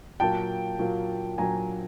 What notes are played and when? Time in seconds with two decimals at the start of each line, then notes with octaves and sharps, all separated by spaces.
0.20 A#2 F#3 A#3 G5 A5
0.79 A#2 F#3 A#3
1.38 A#2 F#3 A#3 G#5 A#5